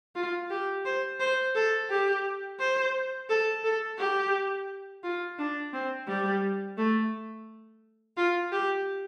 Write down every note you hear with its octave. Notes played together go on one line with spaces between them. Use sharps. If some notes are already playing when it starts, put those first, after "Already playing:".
F4
G4
C5
C5
A4
G4
C5
A4
A4
G4
F4
D4
C4
G3
A3
F4
G4